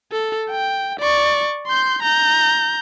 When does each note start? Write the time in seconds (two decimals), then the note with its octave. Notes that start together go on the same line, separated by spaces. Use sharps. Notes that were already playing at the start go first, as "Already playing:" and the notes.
0.12 A4
0.51 G5
1.00 D5 C#6
1.67 C6 G6
2.02 A#5 G6